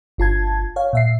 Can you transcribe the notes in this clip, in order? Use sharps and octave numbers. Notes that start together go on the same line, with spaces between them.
G1 F4 A5 G#6
C#5 F5
A#2 E5 C7